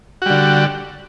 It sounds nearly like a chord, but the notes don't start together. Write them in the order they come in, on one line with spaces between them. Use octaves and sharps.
F#4 G3 D3